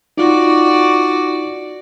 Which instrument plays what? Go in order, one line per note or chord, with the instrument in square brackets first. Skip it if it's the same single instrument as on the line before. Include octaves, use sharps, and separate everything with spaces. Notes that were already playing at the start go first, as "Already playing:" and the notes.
[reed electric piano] D#4 F4 [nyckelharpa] F#4 D5